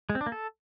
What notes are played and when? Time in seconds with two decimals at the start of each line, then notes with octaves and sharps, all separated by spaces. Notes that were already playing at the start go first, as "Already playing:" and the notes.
0.10 G#3
0.15 C4
0.21 D4
0.26 A#3
0.32 A4